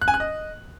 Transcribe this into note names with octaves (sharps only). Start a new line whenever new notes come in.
F#6
G#5
F#6
D#5